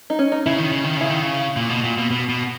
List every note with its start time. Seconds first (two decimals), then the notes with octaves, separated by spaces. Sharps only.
0.10 D#4
0.19 C#4
0.32 D#4
0.46 C#3 E4
0.58 D#3
0.72 C#3
0.84 D#3
0.97 C#3 E4
1.10 D#3
1.22 C#3
1.56 A#2
1.69 B2
1.84 A#2
1.97 B2
2.11 B2
2.29 B2